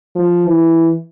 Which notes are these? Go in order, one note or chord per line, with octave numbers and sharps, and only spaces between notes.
F3
E3